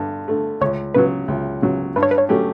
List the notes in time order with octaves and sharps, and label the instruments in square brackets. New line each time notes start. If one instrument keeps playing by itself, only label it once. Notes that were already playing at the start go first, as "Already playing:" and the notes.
Already playing: [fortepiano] G2 D3
D3 A3
[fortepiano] C#2 [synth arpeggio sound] C#5
[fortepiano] C#3 F#3 [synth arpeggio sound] B4
[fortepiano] C#2
C#3 F#3
[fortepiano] G2 [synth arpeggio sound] B4
[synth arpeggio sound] C#5
B4
C#5
[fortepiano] F#3 A3 C#4 G4